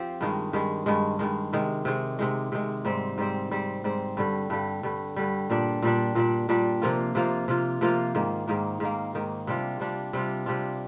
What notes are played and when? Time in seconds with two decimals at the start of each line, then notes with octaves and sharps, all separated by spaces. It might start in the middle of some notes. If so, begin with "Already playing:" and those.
Already playing: F3 C4 G4
0.21 G2 D#3 G#3
0.53 G2 D#3 G#3
0.86 G2 D#3 G#3
1.19 G2 D#3 G#3
1.53 C3 D#3 G#3
1.85 C3 D#3 G#3
2.19 C3 D#3 G#3
2.52 C3 D#3 G#3
2.85 G#2 G3 C4
3.18 G#2 G3 C4
3.51 G#2 G3 C4
3.84 G#2 G3 C4
4.17 G2 D3 G3
4.50 G2 D3 G3
4.83 G2 D3 G3
5.16 G2 D3 G3
5.50 A#2 G3 D4
5.82 A#2 G3 D4
6.15 A#2 G3 D4
6.49 A#2 G3 D4
6.82 C3 F3 A#3 F4
7.15 C3 F3 A#3 F4
7.48 C3 F3 A#3 F4
7.81 C3 F3 A#3 F4
8.15 G#2 D#3 A#3
8.48 G#2 D#3 A#3
8.80 G#2 D#3 A#3
9.14 G#2 D#3 A#3
9.47 C3 G3 D4 F4
9.80 C3 G3 D4 F4
10.13 C3 G3 D4 F4
10.46 C3 G3 D4 F4